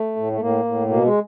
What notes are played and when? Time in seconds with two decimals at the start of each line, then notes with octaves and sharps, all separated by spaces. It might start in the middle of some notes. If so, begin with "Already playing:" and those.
Already playing: A3
0.16 A2
0.33 A3
0.40 A2 A#3
0.65 A2
0.89 B2 A#3
1.05 G#3